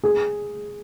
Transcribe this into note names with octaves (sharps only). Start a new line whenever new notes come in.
G#4